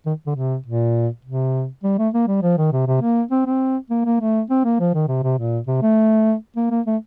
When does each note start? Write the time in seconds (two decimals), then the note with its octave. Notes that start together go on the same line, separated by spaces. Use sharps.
0.06 D#3
0.26 D3
0.36 C3
0.66 A#2
1.25 C3
1.84 G3
1.98 A3
2.14 A#3
2.27 G3
2.43 F3
2.58 D#3
2.72 C3
2.87 C3
3.01 A#3
3.31 C4
3.46 C4
3.90 A#3
4.05 A#3
4.21 A3
4.50 C4
4.64 A#3
4.80 F3
4.94 D#3
5.08 C3
5.23 C3
5.38 A#2
5.67 C3
5.82 A3
6.56 A#3
6.70 A#3
6.86 A3